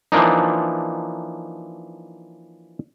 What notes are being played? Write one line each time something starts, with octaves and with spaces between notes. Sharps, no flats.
E3 F3 A#3 D4 D#4